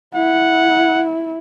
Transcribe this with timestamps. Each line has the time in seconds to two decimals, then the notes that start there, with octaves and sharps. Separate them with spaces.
0.15 E4 F#5